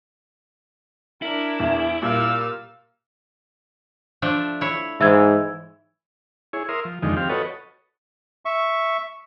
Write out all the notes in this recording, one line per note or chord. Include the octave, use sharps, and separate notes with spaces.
D4 E4 A#4
E2
A#2 G3 F5 E6
F3 A3 D4
E4 C#5
G#2 E3 E5 E6 G#6
E4 G#4 C#5
A#4 E5 C6 D#6 F6
F3
F2 D3 D#3 F3 G#3 D#4
F3 C4 G4 F5
F#4 A4 B4 C#5 D#5
E5 C#6